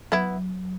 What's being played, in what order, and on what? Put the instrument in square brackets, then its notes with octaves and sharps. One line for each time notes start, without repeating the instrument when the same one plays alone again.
[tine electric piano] F#3 [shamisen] B3 E4